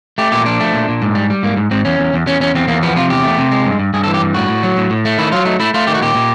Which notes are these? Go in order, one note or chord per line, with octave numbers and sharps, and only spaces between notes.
A3 G4
A#2 G4
F3 D4
A3
A#2
A#2
G#2
G3
G3
G#2 A#3
G#2
G#2 C4
E2 C#4
E2
E2
E2 C#4
E2 C#4
E2 C4
E2 A#3
F3 B3
C3 F4
E2 G4
A3
C3
G#3
G2
G2
G2 G#4
A4
E3
G4
G2
A2 F#4
A2
F#3
A2
A2
A3
D#3 E4
F#3 F4
A3 D#4
A3 E4
A3 F4
D#3 G4
F#4
A#2 G4
A#2